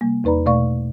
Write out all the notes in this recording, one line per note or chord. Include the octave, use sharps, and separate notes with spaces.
C3 G3 A#3
E2 D#4 B4 D5 A#5 B5
B2 A3 D5 F5 C#6